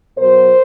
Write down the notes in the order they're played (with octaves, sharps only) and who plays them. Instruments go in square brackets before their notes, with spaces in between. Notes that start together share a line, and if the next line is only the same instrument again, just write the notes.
[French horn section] B2 F#3 A#4 C5